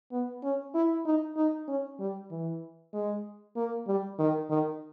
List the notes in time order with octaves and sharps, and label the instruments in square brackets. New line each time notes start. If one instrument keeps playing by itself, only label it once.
[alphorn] B3
C#4
E4
D#4
D#4
C#4
G3
E3
G#3
A#3
G3
D#3
D#3